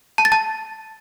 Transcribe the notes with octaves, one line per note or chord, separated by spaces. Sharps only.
A5
A6
A5